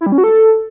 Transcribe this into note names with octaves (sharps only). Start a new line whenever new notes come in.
E4
G3
C#4
F#4
A4